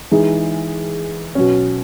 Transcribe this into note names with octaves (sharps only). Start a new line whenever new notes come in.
E3 G#3 D#4 G#4
B2 F#3 C#4